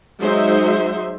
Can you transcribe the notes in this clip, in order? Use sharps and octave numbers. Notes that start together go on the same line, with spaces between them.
F#3 G#3 D#4 C5 E5 C6